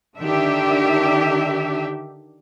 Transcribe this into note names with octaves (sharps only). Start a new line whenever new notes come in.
D3 D#3 D4 G4 E5